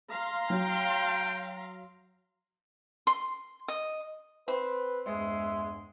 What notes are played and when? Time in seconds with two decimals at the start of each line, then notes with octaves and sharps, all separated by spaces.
0.11 F5 A#5 C6
0.50 F#3 G5
3.07 C6
3.68 D#5
4.48 C4 B4
5.07 E2 G2 G#3 E5 C6